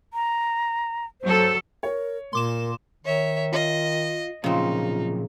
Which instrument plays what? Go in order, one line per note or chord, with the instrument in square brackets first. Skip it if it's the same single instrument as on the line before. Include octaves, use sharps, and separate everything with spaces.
[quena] A#5
[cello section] F#3 A4 [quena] C5
[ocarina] A#4 [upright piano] C#5
[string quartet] A#2 [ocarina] A#4 [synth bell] C6 D6 E7
[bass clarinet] D#3 [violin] C#5 E5
[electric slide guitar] F4 [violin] D#5
[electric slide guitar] A#2 F3 F#3 [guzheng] C#3 C4 [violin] D#4 [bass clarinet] F4